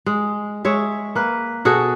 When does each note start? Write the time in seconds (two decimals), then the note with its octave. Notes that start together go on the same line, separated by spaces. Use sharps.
0.06 G#3
0.65 G#3 C#5 E5
1.15 A#3 B4
1.65 B2 F#4 G#4 A4